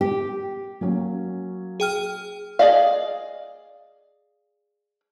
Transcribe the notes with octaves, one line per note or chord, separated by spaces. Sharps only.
G4
F#3 A#3 C#4
G#4 G5 F6
G#4 A4 D5 D#5 F5